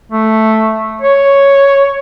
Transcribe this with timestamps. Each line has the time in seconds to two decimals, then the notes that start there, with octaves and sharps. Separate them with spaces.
0.12 A3
1.01 C#5